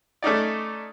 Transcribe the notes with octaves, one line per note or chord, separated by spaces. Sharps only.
A3 C#4 D#4 D5